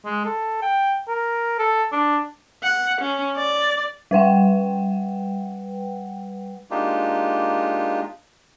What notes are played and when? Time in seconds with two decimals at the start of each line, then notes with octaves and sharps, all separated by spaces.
0.05 G#3
0.25 A4
0.62 G5
1.08 A#4
1.59 A4
1.92 D4
2.63 F#5
3.01 C#4
3.37 D5
4.11 G3 B4 F#5 G5
6.71 G#3 A#3 D4 D#4 F4 G4